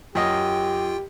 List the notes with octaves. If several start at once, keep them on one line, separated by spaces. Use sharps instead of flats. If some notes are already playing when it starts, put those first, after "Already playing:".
F#2 F4 G4 D#5 G5